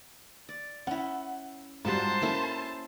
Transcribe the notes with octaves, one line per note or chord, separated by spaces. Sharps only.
D5
C#4 E4 F#5
G#2 G3 F4 F#4 C5 A5
A#3 C#4 E4 A4